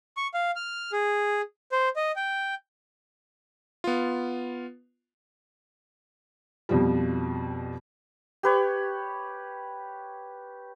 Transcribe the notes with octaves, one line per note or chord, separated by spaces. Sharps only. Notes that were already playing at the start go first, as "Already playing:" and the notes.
C#6
F5
F6
G#4
C5
D#5
G5
B3 F4
F2 B2 F3 G3
G4 B4 C#5